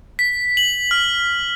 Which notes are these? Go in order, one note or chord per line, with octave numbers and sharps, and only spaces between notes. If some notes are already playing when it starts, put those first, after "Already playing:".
B6
F#7
F6